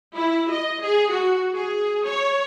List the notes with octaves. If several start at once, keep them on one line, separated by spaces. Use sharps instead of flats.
E4
D#5
G#4
F#4
G#4
C#5